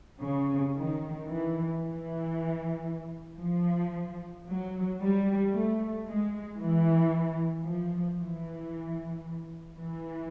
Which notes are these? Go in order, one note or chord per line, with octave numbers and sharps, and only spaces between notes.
C#3
D#3
E3
E3
F3
F#3
G3
A3
G#3
E3
F3
E3
E3